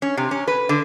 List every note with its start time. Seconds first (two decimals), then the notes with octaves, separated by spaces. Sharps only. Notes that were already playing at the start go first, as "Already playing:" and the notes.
0.02 C#4
0.17 C3
0.31 C#4
0.47 B4
0.69 D3